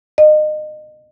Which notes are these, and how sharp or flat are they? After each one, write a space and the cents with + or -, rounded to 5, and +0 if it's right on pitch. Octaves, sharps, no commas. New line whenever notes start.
D#5 -30